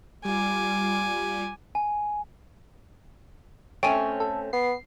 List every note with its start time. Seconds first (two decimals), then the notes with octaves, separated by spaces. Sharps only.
0.25 G3 F4 G#5 D6
1.75 G#5
3.83 A3 C4 C#4 C#5 G5 G#5
4.20 A4
4.53 B3 C7